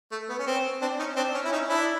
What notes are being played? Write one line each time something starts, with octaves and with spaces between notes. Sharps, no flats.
A3
B3
C#4
C4
C4 D4
C#4 D#4
C4 D4
C#4
E4
C#4 D#4
D4 E4